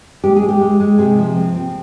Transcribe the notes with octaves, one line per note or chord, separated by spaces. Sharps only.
G#3 G4
G#4
G#3
G4
G#3
G#3
C3 G#4
F3
C4
C4